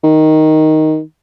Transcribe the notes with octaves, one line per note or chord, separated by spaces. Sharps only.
D#3